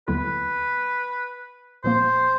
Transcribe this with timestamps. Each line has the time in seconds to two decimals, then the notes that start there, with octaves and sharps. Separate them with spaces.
0.08 D#2 D3 F#3 B3 E4 B4
1.84 A#2 F3 A#3 C5